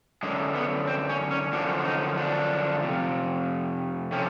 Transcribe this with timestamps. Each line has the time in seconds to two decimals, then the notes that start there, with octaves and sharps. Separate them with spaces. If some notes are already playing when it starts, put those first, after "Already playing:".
0.23 F#2 D3 G#3
0.55 B3
0.87 C4
1.09 C#4
1.31 C#4
1.52 F#2 D3 F3 D4
1.85 D#4
2.17 D4
2.82 F2 C3
4.12 C3 F3 C#4